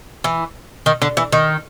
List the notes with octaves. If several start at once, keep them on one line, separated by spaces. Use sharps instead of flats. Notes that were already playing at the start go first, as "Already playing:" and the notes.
E3
D#3
D3
E3
D#3